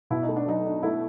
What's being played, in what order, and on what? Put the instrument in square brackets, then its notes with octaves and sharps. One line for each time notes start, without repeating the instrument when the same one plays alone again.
[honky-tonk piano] B2 [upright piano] E4
[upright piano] D#4
[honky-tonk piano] A3
[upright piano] D4
[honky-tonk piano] F#3 [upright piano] D#4
[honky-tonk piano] D4
[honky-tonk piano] A3 [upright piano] E4